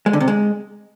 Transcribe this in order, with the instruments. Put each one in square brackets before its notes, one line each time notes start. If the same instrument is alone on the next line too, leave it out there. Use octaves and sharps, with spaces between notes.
[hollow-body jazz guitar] G#3
D3
C3
G#3